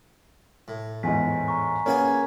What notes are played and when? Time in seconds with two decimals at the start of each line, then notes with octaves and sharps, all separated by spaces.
0.68 A2
1.03 E2 G#2 G#5 B6
1.48 A#5 C#6
1.86 A#3 B3 C#4 G#4 G#5